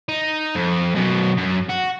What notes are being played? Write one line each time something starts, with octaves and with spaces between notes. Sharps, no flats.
D#4
F2
F#2 B2
F#2
F#4